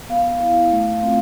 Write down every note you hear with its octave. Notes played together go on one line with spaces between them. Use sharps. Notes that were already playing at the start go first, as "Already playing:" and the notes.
B3 F5
E4
A3
C4 F4